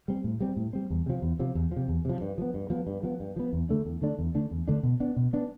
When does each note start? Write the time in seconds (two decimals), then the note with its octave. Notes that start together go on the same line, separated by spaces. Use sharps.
0.08 G3 C4
0.24 A2
0.40 G3 C4
0.57 A2
0.73 G3 C4
0.90 E2
1.06 C3 F3
1.22 E2
1.40 C3 F3
1.55 E2
1.72 C3 F3
1.88 E2
2.05 C3 F3
2.21 G2
2.38 F3 B3
2.54 G2
2.70 F3 B3
2.87 G2
3.03 F3 B3
3.20 G2
3.36 F3 B3
3.53 E2
3.69 D3 A3 D4
3.85 E2
4.02 D3 A3 D4
4.19 E2
4.35 D3 A3 D4
4.51 E2
4.68 D3 A3 D4
4.83 B2
5.00 B3 D4
5.16 B2
5.33 B3 D4